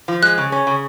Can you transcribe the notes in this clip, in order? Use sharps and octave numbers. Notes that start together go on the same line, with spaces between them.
F3
G#3 F#6
C#3
C#4
C#3